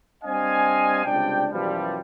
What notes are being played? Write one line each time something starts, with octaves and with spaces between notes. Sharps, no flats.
G3 C4 D4 D#5 F5 G#5
C#2 C3 G3 D4 D5 G5
F#2 B2 E3 F3 G3